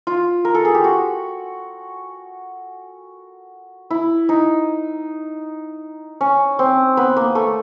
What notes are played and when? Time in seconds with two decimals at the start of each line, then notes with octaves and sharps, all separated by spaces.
0.07 F4
0.45 A#4
0.55 A4
0.65 G#4
0.74 G4
0.84 F#4
3.90 E4
4.29 D#4
6.21 C#4
6.59 C4
6.97 B3
7.17 A#3
7.35 A3